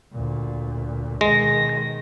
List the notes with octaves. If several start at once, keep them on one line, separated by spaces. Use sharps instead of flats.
D2 A#2
B2 D#3 G#3 A#6